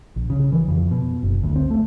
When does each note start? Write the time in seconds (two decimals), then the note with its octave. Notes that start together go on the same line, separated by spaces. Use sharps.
0.16 A#1
0.30 C#3
0.52 E3
0.68 F2
0.91 B2
1.23 F#1
1.43 D2
1.56 C4
1.71 A3